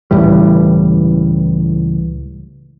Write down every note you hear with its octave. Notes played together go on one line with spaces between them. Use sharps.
C#2 A2 E3 G3